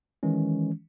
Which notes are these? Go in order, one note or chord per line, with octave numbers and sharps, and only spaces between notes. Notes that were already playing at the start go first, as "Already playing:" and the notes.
D#3 E3 G#3 C#4